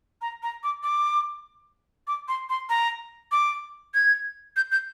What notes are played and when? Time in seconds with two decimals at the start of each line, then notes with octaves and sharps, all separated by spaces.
0.22 A#5
0.43 A#5
0.64 D6
0.83 D6
2.07 D6
2.28 C6
2.50 C6
2.69 A#5
3.32 D6
3.94 G#6
4.56 G6
4.71 G6